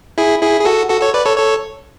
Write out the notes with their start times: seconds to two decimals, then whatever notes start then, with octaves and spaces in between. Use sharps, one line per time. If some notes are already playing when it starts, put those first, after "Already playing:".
0.18 E4 G#4
0.41 E4 G#4
0.60 G#4
0.65 F#4 A4
0.89 F#4 A4
1.01 A4 C#5
1.14 B4 D5
1.26 A4 C#5
1.37 A4 C#5